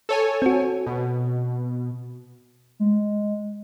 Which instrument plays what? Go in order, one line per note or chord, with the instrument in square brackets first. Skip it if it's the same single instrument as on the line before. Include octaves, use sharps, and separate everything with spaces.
[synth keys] A4 C#5 G#5
[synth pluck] C4 F#4
[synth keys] B2
[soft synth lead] G#3